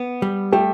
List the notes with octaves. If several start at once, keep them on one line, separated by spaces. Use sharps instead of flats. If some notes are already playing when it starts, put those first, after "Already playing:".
Already playing: B3
G3
A3 G4